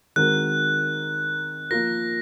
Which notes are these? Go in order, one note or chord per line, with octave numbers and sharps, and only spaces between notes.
D#3 G#3 C4 F#4 A#4 F#6
F3 A#3 F4 A#4 A#6